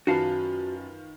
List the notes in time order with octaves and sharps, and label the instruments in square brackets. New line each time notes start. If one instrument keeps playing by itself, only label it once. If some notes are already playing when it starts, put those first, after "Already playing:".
[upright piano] F#2 A5 [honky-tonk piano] D#3 F4 B4 [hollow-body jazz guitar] F#4 F5